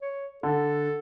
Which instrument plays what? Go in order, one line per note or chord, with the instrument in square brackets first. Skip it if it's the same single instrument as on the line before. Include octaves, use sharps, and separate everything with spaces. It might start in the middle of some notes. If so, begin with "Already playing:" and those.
[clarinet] C#5
[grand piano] D3 [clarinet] A4